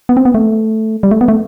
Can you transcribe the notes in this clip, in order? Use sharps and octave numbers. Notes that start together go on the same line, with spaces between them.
B3
C4
B3
A3
G3
A3
B3
A3